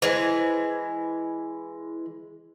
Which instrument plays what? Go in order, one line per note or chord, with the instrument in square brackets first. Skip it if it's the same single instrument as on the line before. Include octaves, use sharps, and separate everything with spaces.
[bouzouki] E3 G#3 [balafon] C5